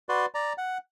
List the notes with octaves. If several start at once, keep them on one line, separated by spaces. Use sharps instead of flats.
F#4 B4 D5 C6
D5 A#5
F#5